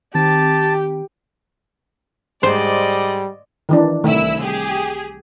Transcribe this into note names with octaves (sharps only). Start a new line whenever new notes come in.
D#3 C4 G4 A5
G#2 G3 C5 D5 D#5
D#3 E3 D4
C2 D#3 A3 E4 E6
G4 G#4